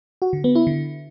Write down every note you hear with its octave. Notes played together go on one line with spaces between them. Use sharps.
F#4
D3
B3
E4
D3